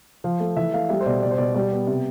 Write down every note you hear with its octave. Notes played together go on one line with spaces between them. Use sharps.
F3 F5
A3
E3 E5
A3 F5
G3 E5
C5
B2 D5
B2 D5
C5
B2 D5
G3 D5
B3
C3